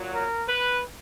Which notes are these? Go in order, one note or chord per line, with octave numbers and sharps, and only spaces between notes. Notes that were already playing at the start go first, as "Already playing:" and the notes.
Already playing: A#2 F#3
A#4
B4